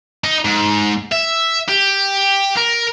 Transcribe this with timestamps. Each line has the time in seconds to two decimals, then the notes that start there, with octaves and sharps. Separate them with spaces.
0.24 D#4
0.45 G#2
1.12 E5
1.69 G4
2.57 A#4